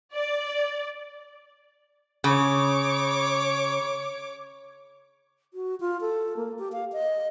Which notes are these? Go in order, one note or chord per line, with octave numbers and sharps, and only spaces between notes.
D5
C#3 C#5 D6
F#4
F4
A4
A#3
G4
F5
D#5